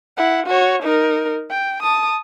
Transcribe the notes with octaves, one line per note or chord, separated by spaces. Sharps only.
E4 F#5
F#4 C#5
D#4 A#4
G5
A5 D#6